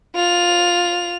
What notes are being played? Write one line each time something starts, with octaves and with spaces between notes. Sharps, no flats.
F4 F7